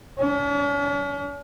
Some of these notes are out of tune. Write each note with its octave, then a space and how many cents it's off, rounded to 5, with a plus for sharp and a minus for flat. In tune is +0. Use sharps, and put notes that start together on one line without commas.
C#4 +45